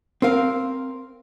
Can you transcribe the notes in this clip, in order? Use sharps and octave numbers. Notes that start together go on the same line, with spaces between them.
C4 A#4 F5